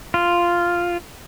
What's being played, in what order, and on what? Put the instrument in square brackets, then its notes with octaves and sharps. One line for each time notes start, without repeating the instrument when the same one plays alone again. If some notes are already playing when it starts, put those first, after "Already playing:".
[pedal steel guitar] F4